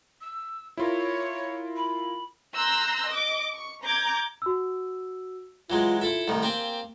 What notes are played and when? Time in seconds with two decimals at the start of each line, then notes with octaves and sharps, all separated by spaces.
0.21 E6
0.77 E4 F4 A#4 C#5
1.76 B5
2.55 A#5 C6 E6 F#6 G6 A#6
3.10 D#5 D6
3.54 C#6
3.85 A#5 D6 G6 G#6
4.42 F#4 E6
5.70 E3 F#3 G#3 F4
6.01 E4 F4 A4 E5
6.28 C2 A2 D#3
6.43 A#3 C4 G4 G#5